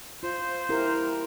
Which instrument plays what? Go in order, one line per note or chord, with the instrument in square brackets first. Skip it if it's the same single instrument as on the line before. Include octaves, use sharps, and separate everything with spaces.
[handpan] F4 [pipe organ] C5
[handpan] E4 G4 A#4